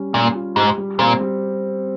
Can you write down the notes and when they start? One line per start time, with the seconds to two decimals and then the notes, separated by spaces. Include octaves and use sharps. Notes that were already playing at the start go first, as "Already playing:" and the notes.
Already playing: G3 C#4
0.13 A#2 G3
0.35 F4
0.56 G#2 G4
0.78 G3
0.99 A#2 C4
1.21 G3